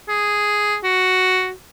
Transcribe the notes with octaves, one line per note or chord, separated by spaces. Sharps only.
G#4
F#4